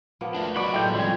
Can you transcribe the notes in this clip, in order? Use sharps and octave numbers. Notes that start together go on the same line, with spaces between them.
F3 A#3 B3
A3 D4
F#3 F#4 D5 B5
A2 G#3 A3 G5 G6
F3 G3 C4 G#5